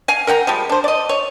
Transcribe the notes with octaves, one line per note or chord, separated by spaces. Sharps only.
F5 G#5
A#4 F#5 G5 A#5
F3 G3 G#3
D4 C5
D5 D#5
C#5